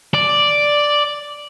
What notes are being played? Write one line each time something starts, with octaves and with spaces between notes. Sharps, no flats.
D5